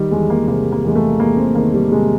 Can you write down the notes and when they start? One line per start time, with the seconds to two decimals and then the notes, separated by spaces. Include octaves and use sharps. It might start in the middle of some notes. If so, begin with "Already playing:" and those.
Already playing: D#3 G3
0.11 E2 G#3
0.30 A#3
0.48 C3 A#3
0.72 A#3
0.84 E2 G#3
0.96 A3
1.19 E2 A#3
1.37 C4
1.55 D#3 A#3
1.73 G3
1.92 C3 G#3